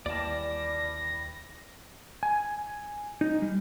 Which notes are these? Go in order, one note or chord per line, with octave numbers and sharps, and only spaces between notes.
D#2 E3 G3 D5 A5 A#6
G#5
D#4
G3